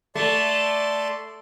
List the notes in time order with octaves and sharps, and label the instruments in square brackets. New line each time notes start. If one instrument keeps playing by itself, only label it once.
[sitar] A3 [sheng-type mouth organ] D5 A5 C6